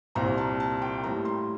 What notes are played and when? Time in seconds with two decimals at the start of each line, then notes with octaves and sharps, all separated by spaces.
0.15 C2 A#2 G3 C4 A#5
0.38 A5
0.60 A5
0.82 G5
1.03 A2 G3 A#3 A#5
1.25 C6